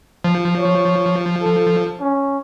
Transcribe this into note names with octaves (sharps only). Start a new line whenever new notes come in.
F3
C#5
A4
C#4